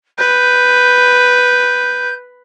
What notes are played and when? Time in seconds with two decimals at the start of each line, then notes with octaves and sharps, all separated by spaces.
0.18 B4 G6